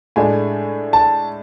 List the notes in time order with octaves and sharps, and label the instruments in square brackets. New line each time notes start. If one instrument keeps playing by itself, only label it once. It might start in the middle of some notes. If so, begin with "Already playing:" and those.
[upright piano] A2 G#3 D4 [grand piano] G#5
[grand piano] A5